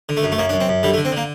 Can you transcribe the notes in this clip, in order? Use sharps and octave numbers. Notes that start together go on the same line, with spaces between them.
D3
A3
F#2
A3
F#2 A#3
D4
F#2
C4
F#2
D3 G3
A3
D3
C4
D3 A#3